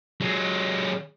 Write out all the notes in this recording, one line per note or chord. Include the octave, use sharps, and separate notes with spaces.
F#3 G#3